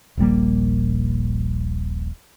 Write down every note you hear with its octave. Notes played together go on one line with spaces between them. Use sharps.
D#1 A#1 G3 A#3